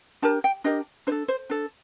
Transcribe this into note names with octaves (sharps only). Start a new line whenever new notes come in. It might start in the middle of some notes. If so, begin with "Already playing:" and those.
D4 G4 A#4 A5
G5
D4 G4 A#4 D#5
D4 A4 C5
C5
D4 A4